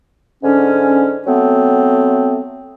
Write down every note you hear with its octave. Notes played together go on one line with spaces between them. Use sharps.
G#2 D3 C#4
F#3 A3 B3 C4